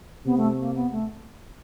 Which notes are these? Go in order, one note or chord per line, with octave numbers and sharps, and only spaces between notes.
C3 B3
A3
A#3
B3
A3